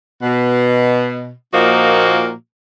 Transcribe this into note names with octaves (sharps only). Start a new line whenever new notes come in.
B2
A#2 F3 A#3 D#4 F#4